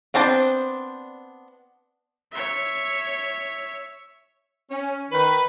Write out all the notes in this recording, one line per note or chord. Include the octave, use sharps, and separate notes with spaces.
B3 C4 D4 C5 D5
C#5 E5
C#4
D#3 B4